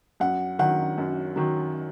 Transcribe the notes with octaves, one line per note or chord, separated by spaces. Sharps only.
F#2 F#5
D#3 F#3 F#5
F#2
D#3 F#3